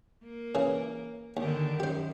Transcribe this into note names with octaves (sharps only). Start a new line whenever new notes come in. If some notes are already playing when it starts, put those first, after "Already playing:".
A#3
C#3 E3
D#2 D3 D#3 G4
F#2 G4 C5